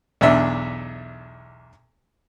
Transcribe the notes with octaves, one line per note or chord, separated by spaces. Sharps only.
B1 E2 D4 E5